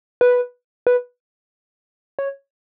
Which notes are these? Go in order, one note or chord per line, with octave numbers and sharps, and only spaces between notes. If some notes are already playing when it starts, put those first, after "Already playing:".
B4
B4
C#5